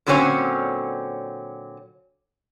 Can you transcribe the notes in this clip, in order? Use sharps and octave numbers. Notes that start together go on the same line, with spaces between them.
A#2 D3 F#3 C4 C#4 C#5